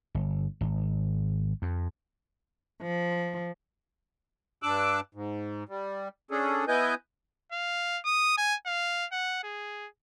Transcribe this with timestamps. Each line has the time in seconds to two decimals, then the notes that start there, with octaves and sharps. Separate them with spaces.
0.15 G1
0.61 G#1
1.62 F2
2.80 F3
4.63 G2 D4 D6 E6 F#6
5.15 G#2
5.69 G3
6.31 C#4 D4 G#4 A4
6.68 B3 E4 B4 D#5 G#5 G6
7.52 F5
8.05 D#6
8.38 G#5
8.66 F5
9.12 F#5
9.44 G#4